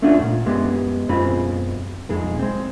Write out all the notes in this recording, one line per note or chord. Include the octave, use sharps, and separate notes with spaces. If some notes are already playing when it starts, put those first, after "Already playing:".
A3 C#4 D4 F4 F#4 C#5
F#2 A#2
F#2 G#3 B3 G4
F#2 B2 G#3 C4 F4 B5
B1 F2 G#3 G#4
G#3 C4